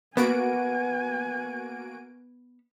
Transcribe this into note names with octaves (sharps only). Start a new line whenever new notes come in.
A#3 B3 F#4 F#5 G#5 D7